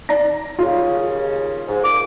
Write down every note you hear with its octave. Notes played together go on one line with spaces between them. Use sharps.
D5 A#5 A#6
D#2 C#3 F4
G#2
A#2 D6